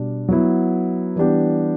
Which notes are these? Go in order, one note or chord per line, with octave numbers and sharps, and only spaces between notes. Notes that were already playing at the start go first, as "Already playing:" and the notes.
Already playing: B2 G3 D4
F#3 B3 E4
E3 G3 B3 D4 G4